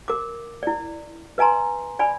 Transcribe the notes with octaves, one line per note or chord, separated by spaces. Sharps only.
A#4 D6
E4 D5
B4 D#5 G#5 A#5 C6
D5 G#5 B5